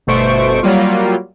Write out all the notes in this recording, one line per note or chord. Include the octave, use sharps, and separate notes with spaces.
G1 B2 A3 C5 C#6 D7
F#3 G3 A#3 F4